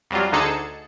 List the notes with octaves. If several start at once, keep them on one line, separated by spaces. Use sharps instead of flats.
F2 F#3 G3 F4
D2 D3 D#4 G#4 A4 C#7